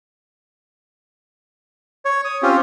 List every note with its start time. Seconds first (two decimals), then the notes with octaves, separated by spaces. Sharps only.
2.05 C#5
2.25 D#6
2.42 C4 C#4 F4 G4